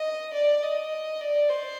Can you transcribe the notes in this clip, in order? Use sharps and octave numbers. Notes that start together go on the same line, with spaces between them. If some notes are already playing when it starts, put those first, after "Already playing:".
Already playing: D#5
D5
D#5
D5
C5